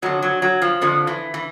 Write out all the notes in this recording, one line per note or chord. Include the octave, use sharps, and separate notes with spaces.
F2 D3 F#3
F#3
F#3
F3
F2 D3 F3
E3
E3